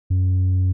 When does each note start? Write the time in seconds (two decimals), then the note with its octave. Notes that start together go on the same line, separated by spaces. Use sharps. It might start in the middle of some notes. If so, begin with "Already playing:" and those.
0.10 F#2